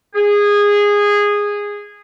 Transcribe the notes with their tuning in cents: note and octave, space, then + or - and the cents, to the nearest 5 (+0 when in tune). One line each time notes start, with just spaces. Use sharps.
G#4 -15